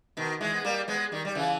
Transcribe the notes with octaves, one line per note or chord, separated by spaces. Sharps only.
B2 D#3
E3 G#3
B3
G3 A#3
G#3 B3
D#3 G3
G3
C#3 E3